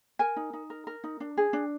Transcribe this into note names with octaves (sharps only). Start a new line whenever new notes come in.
A#4 G#5
D#4
D#4
A#4
A#4
D#4
D4
G#4
D4